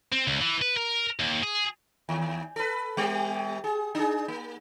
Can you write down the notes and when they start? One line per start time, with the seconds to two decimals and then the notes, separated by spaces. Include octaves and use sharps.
0.12 C4
0.27 C#2
0.41 E3
0.61 B4
0.77 A#4
1.20 D#2
1.43 G#4
2.09 D#2
2.56 A4 B4
2.97 G3 B3 G4
3.64 G#4
3.95 D4 G#4
4.28 A#3